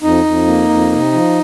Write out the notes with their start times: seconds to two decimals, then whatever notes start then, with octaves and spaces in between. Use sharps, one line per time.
0.02 F2 D#4
0.25 F2
0.46 A#3
0.69 F2
0.91 C3
1.13 F3